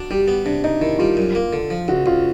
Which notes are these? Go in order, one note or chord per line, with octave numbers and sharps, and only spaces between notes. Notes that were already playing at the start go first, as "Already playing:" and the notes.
Already playing: D4 F#4
G3 G4
B3
C3 D4
C3 D#4
D#3 E4
G3 F4
F#2
A#3
D3
F3
C#2 F#4
C#2 F4